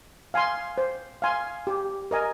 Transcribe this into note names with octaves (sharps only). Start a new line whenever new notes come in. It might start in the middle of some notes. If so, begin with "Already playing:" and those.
F5 G#5 C6
C5
F5 G#5 C6
G4
A#4 D#5 G#5